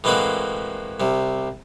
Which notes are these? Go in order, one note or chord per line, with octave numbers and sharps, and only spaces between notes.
A2 E3 G#3 A#3 C4 F#4
C2 C3